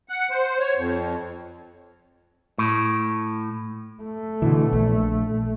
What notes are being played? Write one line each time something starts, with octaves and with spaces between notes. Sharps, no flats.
F#5
C5
C#5
F2
A2
A3
B2 D3 E3
A#1